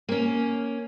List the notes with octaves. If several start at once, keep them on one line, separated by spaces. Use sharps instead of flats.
A#3 C#4